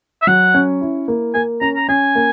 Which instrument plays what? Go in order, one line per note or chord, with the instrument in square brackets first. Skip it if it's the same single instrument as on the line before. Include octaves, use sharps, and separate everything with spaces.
[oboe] E5
[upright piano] F#3 [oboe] F#5
[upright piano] C#4
E4
A#3
[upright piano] A#3 [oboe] G#5
[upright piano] C#4 [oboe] A#5
[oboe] A#5
[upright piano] C#4 [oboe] G#5
[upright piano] A#3